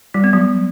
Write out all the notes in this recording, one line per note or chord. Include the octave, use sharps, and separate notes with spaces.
G3
B3
F#3